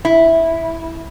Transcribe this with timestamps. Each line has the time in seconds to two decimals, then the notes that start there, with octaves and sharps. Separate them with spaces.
0.05 E4